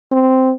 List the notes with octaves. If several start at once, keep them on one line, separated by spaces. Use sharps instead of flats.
C4